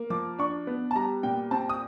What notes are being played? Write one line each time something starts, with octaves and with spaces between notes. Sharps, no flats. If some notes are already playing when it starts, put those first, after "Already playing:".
Already playing: A#3
F3 D6
D4 C#6
B3
A5
G3 A#5
A#2 G5
C4 A5
D#6